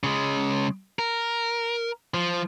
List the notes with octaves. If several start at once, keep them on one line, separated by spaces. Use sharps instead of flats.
C#3 G#3
A#4
F3